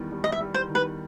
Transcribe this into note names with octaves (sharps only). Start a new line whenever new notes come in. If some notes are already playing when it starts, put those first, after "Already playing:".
Already playing: E2 D#3 G3
G3
D#5
E5
G3
C5
D#3
B4